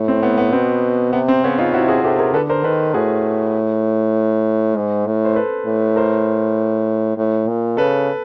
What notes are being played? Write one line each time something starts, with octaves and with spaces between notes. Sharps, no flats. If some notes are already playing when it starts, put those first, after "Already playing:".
Already playing: A2
C4
B3
B3
B2 C4
C3 B3
C4
C#3 B3 C#4
D#4 F4
C3 E4 F#4
F#4 G#4
C3 G4 A4
G#4 A#4
D3 A4 B4
A#4 C5
D#3 A4 B4
A2 F#4 G#4
G#2
A2
C5
A4 B4
A2
A#4 C5
A2
A#2
C#3 A4 B4